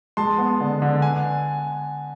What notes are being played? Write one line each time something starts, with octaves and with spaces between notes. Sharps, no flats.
G#3 A5 C6
B3
D3
D3
G#5